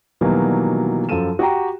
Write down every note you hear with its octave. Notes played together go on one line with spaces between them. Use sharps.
B2 D#3 E3 F#3 G3 A#3
F#2 F3 A4 D#7 E7
F#4 G4 G5 A#5